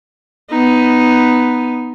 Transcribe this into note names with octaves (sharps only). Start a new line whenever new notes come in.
B3 D#4